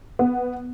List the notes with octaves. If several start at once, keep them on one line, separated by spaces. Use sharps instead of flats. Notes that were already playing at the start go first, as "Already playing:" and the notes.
B3